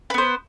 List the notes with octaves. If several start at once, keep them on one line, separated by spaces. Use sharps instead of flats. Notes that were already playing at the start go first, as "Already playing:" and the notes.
B3 B4 C5